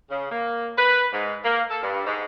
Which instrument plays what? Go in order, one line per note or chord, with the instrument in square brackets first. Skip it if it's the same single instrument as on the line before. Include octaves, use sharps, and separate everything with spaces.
[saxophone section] C#3
A#3
B4
G#2
A#3
A4
G2
G#2